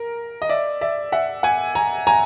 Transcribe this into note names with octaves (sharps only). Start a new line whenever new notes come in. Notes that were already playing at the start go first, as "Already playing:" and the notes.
Already playing: A#4
D#5
D5 E5
D5 E5
E5 F#5
F#5 G#5
G#5 A#5
G#5 A#5